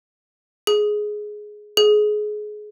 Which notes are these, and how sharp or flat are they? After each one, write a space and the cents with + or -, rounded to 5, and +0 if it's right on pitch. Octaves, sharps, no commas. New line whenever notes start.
G#4 +10
G#4 +25